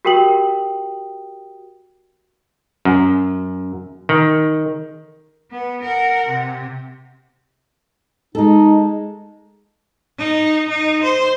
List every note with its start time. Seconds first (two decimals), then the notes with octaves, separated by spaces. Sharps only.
0.05 F#4 G4 A#4 G5 D#6 F#7
2.85 F#2
4.09 D#3
5.51 B3
5.84 A#4 F#5
6.30 C3
8.35 G#3 D#4 A4
10.19 D#4
10.70 D#4
11.04 C5